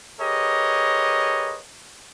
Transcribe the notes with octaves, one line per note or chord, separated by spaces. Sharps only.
G4 G#4 A#4 B4 C#5 D#5